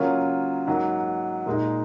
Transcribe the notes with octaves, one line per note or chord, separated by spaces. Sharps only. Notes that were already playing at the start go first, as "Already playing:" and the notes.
Already playing: C#3 F#3 A#3 C#4 F4
G#2 F#3 A#3
A#2 G#3 D#4